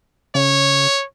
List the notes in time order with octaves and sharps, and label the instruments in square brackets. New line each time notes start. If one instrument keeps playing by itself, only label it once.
[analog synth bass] C#3 [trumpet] C#5